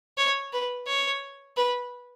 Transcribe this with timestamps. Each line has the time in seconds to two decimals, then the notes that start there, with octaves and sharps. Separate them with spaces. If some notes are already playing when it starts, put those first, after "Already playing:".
0.18 C#5
0.53 B4
0.88 C#5
1.57 B4